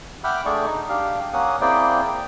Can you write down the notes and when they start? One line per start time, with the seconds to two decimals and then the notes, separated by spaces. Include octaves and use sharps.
0.24 E5 F#5 G5 B5 D6 F6
0.45 A3 D4 G#4 D5 C#6
0.67 D#4
0.89 D4 G4 F5
1.33 A#3 C#4 F#5 D#6
1.61 A#3 C4 E4 G#4 D5 G5